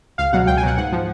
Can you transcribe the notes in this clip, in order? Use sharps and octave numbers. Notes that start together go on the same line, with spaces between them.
C#2 F5
B2 F#3 F#5
C#2 G5
G#5
B2 F#3 F#5
G#2 F#5
F3